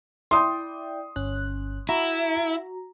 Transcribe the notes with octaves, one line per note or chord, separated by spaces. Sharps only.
E4 D5 G5 C6 D#6
G1 C#4 F#6
E4 F#4 A#5